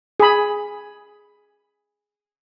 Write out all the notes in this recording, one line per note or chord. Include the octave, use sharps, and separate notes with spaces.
G#4 B5